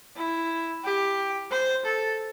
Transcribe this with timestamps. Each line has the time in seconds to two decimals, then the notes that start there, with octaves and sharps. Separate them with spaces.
0.17 E4
0.85 G4
1.51 C5
1.85 A4